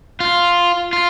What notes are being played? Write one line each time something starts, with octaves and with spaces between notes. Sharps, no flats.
F4
F4